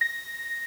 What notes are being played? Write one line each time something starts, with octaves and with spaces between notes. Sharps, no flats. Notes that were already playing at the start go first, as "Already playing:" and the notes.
A#6